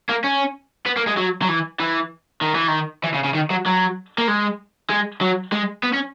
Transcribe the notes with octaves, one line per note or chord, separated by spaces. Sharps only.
A#3
C#4
B3
A#3
G#3
F#3
F#3
E3
E3
D#3
E3
D#3
E3
C#3
C#3
D#3
F#3
F#3
A#3
G#3
G#3
F#3
G#3
B3
C#4